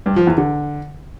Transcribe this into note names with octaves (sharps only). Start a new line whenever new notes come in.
G2
F3
E2
D3